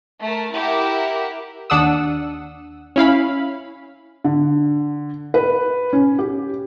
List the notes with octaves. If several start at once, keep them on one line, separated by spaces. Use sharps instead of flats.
A3 A#4 A5
E4 G4 A#4 E5 F#5
D#2 D4 F#5 D#6 E6
C#4 E4 F5 B5
D3
B4
C#4
G4